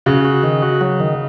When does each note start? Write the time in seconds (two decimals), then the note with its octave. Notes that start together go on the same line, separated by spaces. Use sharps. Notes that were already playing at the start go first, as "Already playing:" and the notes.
0.06 C#3 F#4
0.25 F#4
0.43 D#3
0.62 F#4
0.81 F#3
1.00 D#3